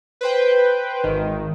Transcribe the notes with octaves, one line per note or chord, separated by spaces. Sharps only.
B4 C5 G5
G#1 D#3